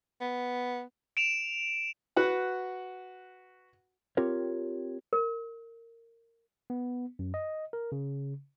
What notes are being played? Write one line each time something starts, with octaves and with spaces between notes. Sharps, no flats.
B3
D7 E7 F7
F#4 B4 F#5
C4 F4 G4 A#4 C#5
A#4
B3
F#2
D#5
A#4
C#3